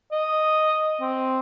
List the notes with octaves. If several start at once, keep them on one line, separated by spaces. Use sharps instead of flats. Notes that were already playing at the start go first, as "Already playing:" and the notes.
D#5
C4